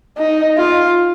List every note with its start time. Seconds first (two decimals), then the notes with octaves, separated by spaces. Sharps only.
0.18 D#4
0.57 F4